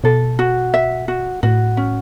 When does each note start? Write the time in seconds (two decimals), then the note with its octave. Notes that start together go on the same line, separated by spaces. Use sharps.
0.04 B2 A4
0.39 F#4
0.74 E5
1.08 F#4
1.43 A2 F#4
1.77 C#4